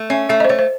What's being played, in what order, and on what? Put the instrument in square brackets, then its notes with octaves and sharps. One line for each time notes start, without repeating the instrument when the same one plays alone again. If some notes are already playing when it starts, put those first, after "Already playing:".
Already playing: [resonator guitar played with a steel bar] A3
[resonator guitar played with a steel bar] C#4 [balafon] E5
[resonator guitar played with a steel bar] A3 [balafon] E5
[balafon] D#5
C5
[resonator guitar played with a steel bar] A3 [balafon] C#5
[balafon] C5